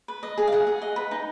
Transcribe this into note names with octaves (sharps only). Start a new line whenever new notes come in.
B4
D#5
G#4
F5
G#4 F#5
G#4
D#5
B4
D#4